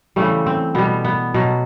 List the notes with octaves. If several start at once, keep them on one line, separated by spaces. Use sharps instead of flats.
C#3 E3 G3 A3
C4
B2 G3 B3
B3
B2 F#3